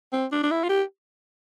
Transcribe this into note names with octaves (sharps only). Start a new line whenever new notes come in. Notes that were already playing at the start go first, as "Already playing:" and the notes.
C4
D4
D4
E4
F4
G4